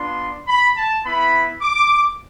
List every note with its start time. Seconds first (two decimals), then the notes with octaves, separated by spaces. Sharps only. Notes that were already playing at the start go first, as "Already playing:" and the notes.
Already playing: B3 D4 F4 C6
0.48 B5
0.76 A5
1.05 B3 E4 B5
1.62 D6